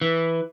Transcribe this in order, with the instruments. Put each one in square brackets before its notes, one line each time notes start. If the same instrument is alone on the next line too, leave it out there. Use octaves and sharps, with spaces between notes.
[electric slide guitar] E3